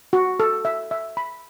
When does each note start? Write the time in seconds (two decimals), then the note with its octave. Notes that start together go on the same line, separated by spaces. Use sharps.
0.13 F#4
0.40 A4
0.65 E5
0.91 E5
1.17 B5